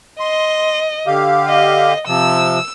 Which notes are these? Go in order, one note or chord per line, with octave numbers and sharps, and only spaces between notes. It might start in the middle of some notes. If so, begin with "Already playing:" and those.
D#5 C6
D3 G4 F5
D#5
C3 F3 E6